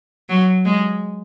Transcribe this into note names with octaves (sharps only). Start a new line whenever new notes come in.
F#3
G#3